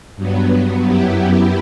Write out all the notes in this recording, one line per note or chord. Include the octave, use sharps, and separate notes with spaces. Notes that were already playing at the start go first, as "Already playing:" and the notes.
G2 F#3 B3
F#2 F#3 B3 E4 G4